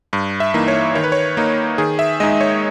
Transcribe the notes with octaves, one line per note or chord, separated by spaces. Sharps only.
G2
E5
E3 A#3 D#4
C#5
D#3 C#5
B4
C#5
A#3 D#4
D#3 G#4
E5
G#3 D#4 D#5
C#5